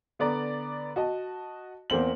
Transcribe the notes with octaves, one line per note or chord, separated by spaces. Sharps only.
D3 B3 D5 A#5
F#4 D#5 A5
E2 A#3 C4 F#7